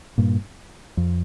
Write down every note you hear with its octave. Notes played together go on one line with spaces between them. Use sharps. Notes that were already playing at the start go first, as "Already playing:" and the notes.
G2 A#2
F2